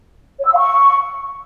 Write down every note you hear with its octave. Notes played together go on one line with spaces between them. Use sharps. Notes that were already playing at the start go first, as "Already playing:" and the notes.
C#5
E6
F5
C#6